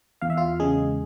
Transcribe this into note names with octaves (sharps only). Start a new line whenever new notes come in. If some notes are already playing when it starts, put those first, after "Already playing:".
E2 F5
E5
F4 F5
C#3 G#3 G#4